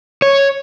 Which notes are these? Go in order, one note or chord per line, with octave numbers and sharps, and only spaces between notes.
C#5